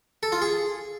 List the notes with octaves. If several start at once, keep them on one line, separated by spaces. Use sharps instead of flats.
A4
F4
G#4